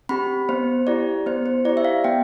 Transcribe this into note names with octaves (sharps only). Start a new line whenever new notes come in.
C4 G4 B5
B3 C5
E4 G4 D5
B3 C5
C5
E4 G4 D5
E5
F5
B3 G5